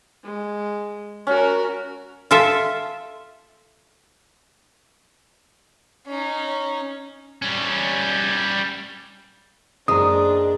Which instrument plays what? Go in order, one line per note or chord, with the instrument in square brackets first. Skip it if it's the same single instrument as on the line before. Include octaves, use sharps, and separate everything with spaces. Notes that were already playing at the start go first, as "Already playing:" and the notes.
[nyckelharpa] G#3
[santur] C#4 [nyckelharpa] F#4 A#4
[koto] F4 A4 E5
[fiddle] C#4 D#4
[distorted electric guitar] G3 C#4
[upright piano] F#1 C5 [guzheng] G#3 [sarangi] D4 [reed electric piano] A#5 D#6